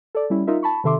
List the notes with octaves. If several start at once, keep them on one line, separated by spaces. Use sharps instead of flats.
A4 D5
G3 C#4 E4
D#4 F4 A#4 E5
A5 B5 C#6
C3 D#3 A4 E5 C6 D6